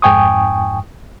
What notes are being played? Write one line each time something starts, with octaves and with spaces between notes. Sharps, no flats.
F2 G#2 G5 G#5 C#6 D#6